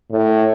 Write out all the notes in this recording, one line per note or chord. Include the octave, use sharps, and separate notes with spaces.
A2